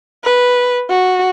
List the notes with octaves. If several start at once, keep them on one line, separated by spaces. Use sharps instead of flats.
B4
F#4